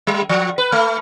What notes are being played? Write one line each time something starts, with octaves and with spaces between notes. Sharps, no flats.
G3
F3
B4
A3